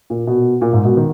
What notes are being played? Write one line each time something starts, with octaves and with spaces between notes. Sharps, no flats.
A#2
B2
A#2
G#2
B2
D#3